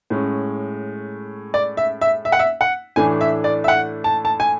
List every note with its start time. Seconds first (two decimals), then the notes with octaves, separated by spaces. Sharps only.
0.10 A2 G#3 C#4
1.54 D5
1.77 E5
2.01 E5
2.25 E5
2.32 F#5
2.39 E5
2.61 F#5
2.96 A2 E3 A3 D4 G#5
3.21 E5
3.44 D5
3.64 E5
3.68 F#5
4.04 A5
4.25 A5
4.40 G#5